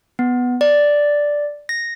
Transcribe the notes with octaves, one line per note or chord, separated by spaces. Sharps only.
B3
D5
A#6